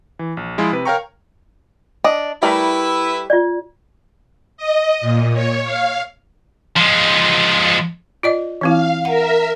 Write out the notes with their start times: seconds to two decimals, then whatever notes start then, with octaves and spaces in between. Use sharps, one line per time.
0.19 E3
0.37 A#1
0.58 F3 G#3 E4 F4
0.72 C3 B4
0.85 A#4 C#5 F5 G5 A#5 C#6
2.04 D4 D#5
2.43 G3 A3 E4 A#4 B4 E5
3.30 F4 D5
4.57 D#5
5.01 A#2
5.33 C#5
5.64 F5
6.77 F3 G#3
8.23 F4 D5 D#5
8.61 E3 C4 E4 F5
9.05 A#4 E5 F#5 A#5